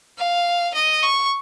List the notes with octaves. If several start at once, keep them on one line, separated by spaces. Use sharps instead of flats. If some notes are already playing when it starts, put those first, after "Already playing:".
F5
D#5
C#6